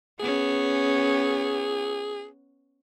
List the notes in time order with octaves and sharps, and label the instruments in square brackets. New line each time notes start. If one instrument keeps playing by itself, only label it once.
[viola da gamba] B3 C#4 [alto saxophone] G#4